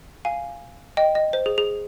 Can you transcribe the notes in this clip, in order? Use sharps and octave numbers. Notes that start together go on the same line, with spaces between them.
F5 G#5
D#5 G5
D#5
C5
G#4
G#4